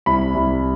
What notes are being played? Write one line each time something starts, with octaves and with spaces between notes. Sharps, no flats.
C2 B5
C2